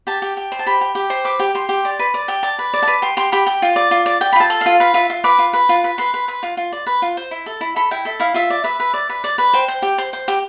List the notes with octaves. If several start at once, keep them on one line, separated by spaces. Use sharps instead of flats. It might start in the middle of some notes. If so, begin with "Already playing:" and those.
G4 A5
G4
G4
C5
A5
G4 B5
G4
G4
C5
B4 D6
G4
G4 C6
G4
D5
B4
D5
G4
D5 A5
B4
D5
A5
B4
G4 C6
G4 C6
G4 B5
G4
F4
D5
F4
D5
D5 G5
B5
F4 A5
A4
F4 F5
B4 F5
F4 E5
F4
B4 D6
F4
B4
F4
B4
B4 C6
B4
B4
F4
F4
D5
B4
F4
C5
E4
A4
E4
A4 B5
E4 G5
A4 E5
E4 F5
F4 E5
D5
B4 E5
B4
D5
B4
D5
B4
C5 G5
C5
G4
C5
C5
G4